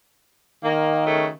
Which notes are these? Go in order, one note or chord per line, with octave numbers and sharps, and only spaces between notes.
D#3 A#3
C#3 F#3 A3